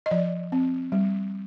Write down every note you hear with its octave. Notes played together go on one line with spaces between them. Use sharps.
D#5
F3 D5
C4
G3